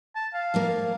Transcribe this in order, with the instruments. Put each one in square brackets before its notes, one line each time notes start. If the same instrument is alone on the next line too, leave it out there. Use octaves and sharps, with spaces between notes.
[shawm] A5
F5
[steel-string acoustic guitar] F3 A3 A#3